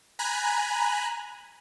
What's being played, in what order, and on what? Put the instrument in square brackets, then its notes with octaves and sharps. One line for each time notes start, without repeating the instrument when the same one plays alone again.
[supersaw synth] G#5 A#5 B5 F#6